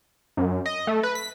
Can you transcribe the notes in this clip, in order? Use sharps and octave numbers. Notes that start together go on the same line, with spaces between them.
F#2
D#5
A3
B4
B6